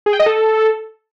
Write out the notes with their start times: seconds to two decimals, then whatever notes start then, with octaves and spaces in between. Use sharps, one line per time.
0.06 G#4
0.13 G5
0.19 D#5
0.26 A4